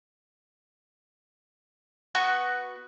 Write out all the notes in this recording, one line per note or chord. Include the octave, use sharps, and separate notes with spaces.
B3 F#4 C#6